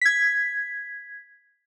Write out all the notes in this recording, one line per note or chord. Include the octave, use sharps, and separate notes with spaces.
G#6 B6